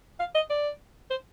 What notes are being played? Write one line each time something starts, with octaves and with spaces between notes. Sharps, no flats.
F5
D#5
D5
C5